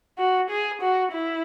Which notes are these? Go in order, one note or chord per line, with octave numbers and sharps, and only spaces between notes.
F#4
G#4
F#4
E4